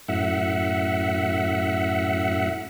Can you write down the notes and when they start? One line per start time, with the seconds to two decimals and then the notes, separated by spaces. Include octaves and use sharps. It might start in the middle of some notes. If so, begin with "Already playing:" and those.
0.08 F#2 A2 E5 F#5